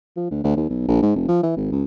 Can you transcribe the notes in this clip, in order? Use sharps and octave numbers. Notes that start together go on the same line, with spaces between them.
F3
D2
D2
D#2
B1
A#1
G#2
F1
F3
E3
G#1
C#2